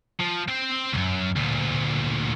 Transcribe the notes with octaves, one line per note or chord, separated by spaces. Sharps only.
F3
C4 C5
C#2 F#2
D2 A#2